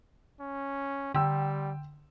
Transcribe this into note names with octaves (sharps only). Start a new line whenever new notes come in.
C#4
D3 G3 G5 E6